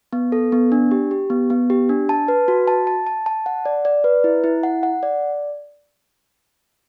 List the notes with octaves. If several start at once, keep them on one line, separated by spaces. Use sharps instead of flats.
B3
A4
B3
D4
G4
G4
B3
B3
G4
D4
A5
B4
F#4
A5
A5
A5
A5
F#5
D5
D5
B4
E4
E4
F#5
F#5
D5